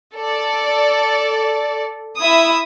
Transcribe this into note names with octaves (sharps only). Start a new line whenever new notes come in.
A4 D5
E4 E5 D#6